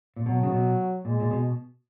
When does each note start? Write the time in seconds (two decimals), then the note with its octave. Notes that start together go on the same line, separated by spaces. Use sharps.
0.16 A#2
0.26 B2 F#3
0.43 C#3
0.52 B2
1.05 A#2 G#3
1.20 A#2
1.31 B2